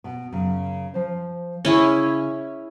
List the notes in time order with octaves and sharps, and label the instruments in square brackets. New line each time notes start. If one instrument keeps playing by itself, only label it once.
[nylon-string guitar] B2
F#2 C#3
F3 C5
[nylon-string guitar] C#3 G#5 [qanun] C#4 E4 G#4